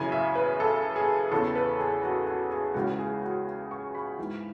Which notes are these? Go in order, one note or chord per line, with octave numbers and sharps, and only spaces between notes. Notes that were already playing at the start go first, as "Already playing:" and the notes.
Already playing: F#2 C#3 E3 G#5
E5
B4
A4
G#4
E2 C#3 E3 A4
B4
G#4
F#4
F#4
G#4
C#2 C#3 E3 F#4
G#4
F#4
C#6
B5
G#2 E3